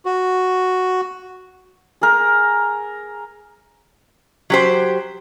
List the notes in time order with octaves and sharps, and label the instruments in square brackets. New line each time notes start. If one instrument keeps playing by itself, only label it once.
[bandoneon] F#4
[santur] G#4 A#4
[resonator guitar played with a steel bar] F#3 G4 C5